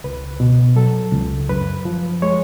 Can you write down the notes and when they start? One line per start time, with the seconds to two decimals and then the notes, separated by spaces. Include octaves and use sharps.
0.04 C#2 B4
0.40 B2
0.76 F#3 A4
1.13 C#2
1.49 F#2 B4
1.85 F3
2.22 G#3 C#5